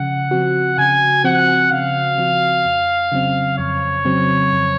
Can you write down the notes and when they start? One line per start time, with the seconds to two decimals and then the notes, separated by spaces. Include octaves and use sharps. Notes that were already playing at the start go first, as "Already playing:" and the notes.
Already playing: C#3 F3 F#5
0.31 F3 C4 F#4
0.78 C#3 G#5
1.24 F3 C4 F#4 F#5
1.72 C#3 F5
2.18 F3 C4 F#4
2.65 F2
3.12 C#3 F#3 C4
3.58 F2 C#5
4.05 C#3 F#3 C4
4.52 F2